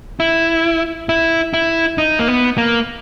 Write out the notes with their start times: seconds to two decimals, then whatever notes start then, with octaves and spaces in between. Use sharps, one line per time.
0.20 E4
1.09 E4
1.54 E4
1.98 D#4
2.19 A#3
2.28 B3
2.58 A#3